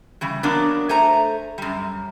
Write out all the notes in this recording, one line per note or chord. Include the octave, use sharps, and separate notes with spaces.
C#3 E3 G3
F#3 A#3 B3 D4 A#4
A3 C5 G#5 A#5
F#2 G3